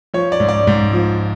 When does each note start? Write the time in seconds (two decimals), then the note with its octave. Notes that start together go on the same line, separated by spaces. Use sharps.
0.14 F3 C#5
0.32 D5
0.40 G#2
0.49 D5
0.67 G#2
0.93 F3